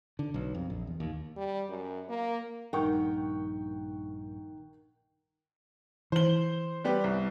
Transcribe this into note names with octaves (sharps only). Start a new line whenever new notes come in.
D3
B1
F2
A#1
E2
D#2
G3
F#2
A#3
A#1 G2 D#3 F#5 G5 C#6
E3 C5 G7
G3 B3 G4
C2